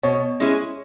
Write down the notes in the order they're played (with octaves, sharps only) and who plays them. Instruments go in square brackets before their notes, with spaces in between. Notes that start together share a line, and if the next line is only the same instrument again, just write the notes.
[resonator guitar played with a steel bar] B2 [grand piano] C#5
[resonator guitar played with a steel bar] G#3 C#4 E4 G#4